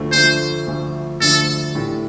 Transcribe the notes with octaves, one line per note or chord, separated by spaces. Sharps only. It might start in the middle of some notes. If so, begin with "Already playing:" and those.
Already playing: D2 D3 F3 A3
D2 D3 F3 A3 C5
D2 D3 F3 A3
D2 D3 F3 A3 A4
A2 E3 A3 D4 G4